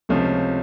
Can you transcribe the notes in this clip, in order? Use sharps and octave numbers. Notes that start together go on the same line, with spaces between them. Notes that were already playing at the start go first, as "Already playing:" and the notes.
C#2 C3 F3 A3 C#4